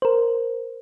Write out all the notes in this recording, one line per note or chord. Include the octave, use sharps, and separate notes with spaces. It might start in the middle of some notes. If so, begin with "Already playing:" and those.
A#4 C5